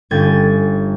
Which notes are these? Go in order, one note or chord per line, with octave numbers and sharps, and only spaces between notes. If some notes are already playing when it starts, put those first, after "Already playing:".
G1 C#4 G5 G#6 A6 D#7